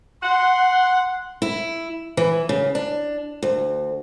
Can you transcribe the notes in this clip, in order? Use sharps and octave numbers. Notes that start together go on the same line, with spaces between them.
F#5 C6
E4
E3
C#3
D4
D2